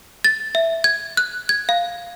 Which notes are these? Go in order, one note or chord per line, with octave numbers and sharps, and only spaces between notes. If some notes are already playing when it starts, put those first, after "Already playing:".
A6
E5
G#6
F#6
G#6
F5